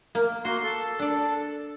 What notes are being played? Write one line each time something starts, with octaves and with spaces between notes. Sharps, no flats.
A#3
A#3 F#4 C6
A4
D4 D5